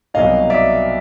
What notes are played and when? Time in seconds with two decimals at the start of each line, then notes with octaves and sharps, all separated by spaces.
0.14 C2 B2 F#3 A#3 D#4 D#5 F5
0.50 D5 E5